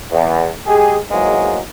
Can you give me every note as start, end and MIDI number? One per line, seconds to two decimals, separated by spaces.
0.11 0.47 40
0.67 0.97 56
0.67 0.97 67
0.67 0.97 68
1.11 1.59 40
1.11 1.59 44
1.11 1.59 54
1.11 1.59 56
1.11 1.59 58